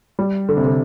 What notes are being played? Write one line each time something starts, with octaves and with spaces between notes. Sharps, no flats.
G3
D3
C3
D3